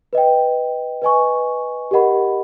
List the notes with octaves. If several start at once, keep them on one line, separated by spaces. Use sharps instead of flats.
B4 D#5 G5
B4 D#5 G#5 C#6
G4 A#4 D#5 F#5 B5